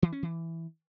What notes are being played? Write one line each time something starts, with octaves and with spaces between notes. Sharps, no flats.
E3
C#4
E3